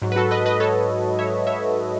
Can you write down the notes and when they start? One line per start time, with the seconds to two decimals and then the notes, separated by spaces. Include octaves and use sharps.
0.02 G#2 F#3
0.12 B4
0.16 F#4 A4
0.31 B4 D#5
0.46 B4 D#5
0.60 A4 C#5
1.19 C#5 E5
1.47 C#5 E5